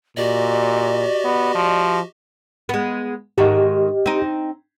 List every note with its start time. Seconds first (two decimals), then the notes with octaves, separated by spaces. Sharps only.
0.17 A#2 F#4 G4 D5 D#5
1.25 B3
1.55 F3
2.69 G#3 B3
3.38 G#2 D#3 F#4 G4 D#5
4.06 C4 D#4